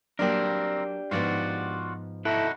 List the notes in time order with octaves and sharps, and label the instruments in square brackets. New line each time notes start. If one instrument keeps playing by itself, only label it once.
[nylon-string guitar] F#3 A#3 D5 [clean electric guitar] C4 A#4 [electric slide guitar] D4 G4
[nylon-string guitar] G#2 F3 B3 [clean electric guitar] F4 F#4 D5
[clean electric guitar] D#4 F#4 B4 [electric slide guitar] E4 A4